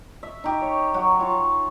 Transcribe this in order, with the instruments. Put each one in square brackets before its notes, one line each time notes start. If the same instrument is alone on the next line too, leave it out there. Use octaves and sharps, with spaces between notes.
[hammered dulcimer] E5
D#4 G4
C#5
F#3 F#4
F4 C#5